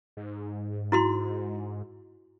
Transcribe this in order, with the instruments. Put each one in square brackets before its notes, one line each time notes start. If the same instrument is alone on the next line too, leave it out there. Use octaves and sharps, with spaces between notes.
[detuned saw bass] G#2
[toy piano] E4 F#4 C6